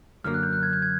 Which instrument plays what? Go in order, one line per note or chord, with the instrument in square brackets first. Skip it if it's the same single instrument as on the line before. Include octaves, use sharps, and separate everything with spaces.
[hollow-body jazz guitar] F#2 D3 F#3 A#3 [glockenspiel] F6
[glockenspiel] F#6
G6
F#6
G#6
G6
G#6